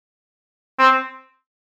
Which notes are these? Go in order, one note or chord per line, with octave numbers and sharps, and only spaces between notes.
C4